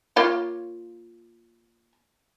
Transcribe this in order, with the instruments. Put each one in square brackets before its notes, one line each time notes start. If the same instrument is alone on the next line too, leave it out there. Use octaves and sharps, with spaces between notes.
[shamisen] A#3 F4 C#5